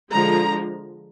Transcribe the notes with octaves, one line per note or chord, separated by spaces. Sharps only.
D3 F3 G#3 A#5